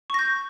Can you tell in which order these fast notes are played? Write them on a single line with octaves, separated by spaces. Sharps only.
C#6 A#6 G6